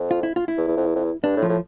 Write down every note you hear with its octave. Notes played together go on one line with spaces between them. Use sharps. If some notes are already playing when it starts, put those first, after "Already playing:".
Already playing: F2
F4
E4
F4
E4
E2
E2
F2
E2
F2
E2
G2 D4
A2
F3
A2